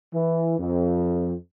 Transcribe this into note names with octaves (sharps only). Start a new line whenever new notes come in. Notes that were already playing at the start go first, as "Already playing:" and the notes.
E3
F2